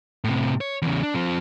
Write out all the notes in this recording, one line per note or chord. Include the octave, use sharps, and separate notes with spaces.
A2 C3
C#5
E2 C#3
D4
F3 C4